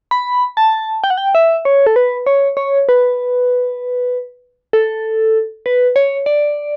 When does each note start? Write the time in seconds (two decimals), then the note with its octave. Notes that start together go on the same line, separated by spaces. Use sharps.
0.11 B5
0.57 A5
1.04 G5
1.10 F#5
1.18 G5
1.35 E5
1.65 C#5
1.86 A4
1.96 B4
2.27 C#5
2.57 C#5
2.89 B4
4.73 A4
5.66 B4
5.96 C#5
6.26 D5